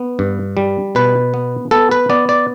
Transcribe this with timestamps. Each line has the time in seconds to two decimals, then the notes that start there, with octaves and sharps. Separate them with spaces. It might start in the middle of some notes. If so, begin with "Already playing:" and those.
Already playing: B3
0.19 G2
0.57 G3
0.95 B2 B4
1.34 B3
1.71 B3 A4
1.91 B4
2.10 B3 D5
2.29 D5